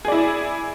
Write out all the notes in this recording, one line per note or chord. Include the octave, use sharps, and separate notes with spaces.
E4 G#4 D5